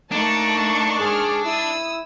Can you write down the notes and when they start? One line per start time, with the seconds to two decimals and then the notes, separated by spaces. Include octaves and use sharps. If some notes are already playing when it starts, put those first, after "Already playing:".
0.12 A3 A#3 D4 D#4 A5 C#6
1.00 G#2 G#4 F6
1.45 E4 D#6 E6